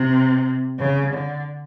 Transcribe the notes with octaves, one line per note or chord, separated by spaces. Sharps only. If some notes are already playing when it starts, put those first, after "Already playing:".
Already playing: C3
C#3
D3